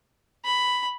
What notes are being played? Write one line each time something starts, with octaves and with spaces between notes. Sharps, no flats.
B5